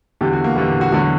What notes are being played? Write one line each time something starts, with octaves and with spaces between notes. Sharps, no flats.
E2 D3 G3 G4
F#4
A#3
E2 D3 G3 B3
F#4
E2 D3 F#3 F#4